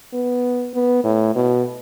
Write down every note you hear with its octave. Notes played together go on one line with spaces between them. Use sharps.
B3
B3
A2
B2